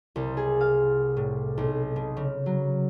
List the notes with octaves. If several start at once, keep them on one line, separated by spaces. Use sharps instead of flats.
C2
G#4
F5
A2
B1
B2
C#3
F#3